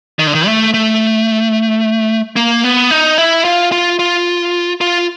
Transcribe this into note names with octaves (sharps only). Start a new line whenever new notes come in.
D#3
D3
D#3
A3
A3
A#3
B3
D#4
E4
F4
F4
F4
F4